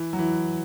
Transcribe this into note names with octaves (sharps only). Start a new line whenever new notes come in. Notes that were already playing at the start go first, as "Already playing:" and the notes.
Already playing: E3
F#3
E3